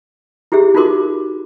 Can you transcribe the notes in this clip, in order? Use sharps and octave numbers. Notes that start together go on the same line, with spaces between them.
E4 G4 G#4 E5
D#4 F4 F#4 A#4 C6 D6